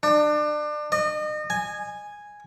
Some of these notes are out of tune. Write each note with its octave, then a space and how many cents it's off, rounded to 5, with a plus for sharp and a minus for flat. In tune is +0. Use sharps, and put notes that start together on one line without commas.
D4 +30
D#5 -35
G#5 -5